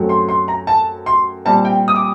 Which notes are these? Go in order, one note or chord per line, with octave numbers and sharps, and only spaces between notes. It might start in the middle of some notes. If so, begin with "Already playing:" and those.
Already playing: F#2 F#3 A3 C4
C6
C6
A#5
A5
C6
A#2 G3 C4 A5
G5
D#6
D6